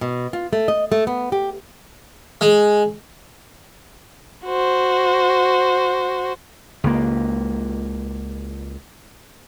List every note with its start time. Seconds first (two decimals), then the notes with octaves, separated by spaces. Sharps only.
0.01 B2
0.33 F4
0.53 A3
0.68 D#5
0.92 A3
1.07 B3
1.32 G4
2.41 G#3
4.46 F#4 C5
6.84 C#2 A#3